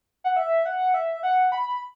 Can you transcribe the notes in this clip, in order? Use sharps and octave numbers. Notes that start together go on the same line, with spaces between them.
F#5
E5
F#5
E5
F#5
B5